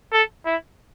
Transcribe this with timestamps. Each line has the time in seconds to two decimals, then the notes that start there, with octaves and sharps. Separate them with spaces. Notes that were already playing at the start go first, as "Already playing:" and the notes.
0.13 A4
0.46 E4